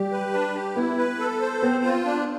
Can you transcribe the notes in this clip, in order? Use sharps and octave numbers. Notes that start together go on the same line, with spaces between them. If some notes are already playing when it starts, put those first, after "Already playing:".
Already playing: G3 G4
B4
D4
G4
B3 E4
B4
A4
C5
B3 C4
F4
D4